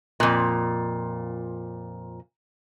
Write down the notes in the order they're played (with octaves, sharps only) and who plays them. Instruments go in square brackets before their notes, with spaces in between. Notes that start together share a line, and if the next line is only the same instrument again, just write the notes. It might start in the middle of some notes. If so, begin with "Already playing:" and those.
[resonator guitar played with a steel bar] F2 A#2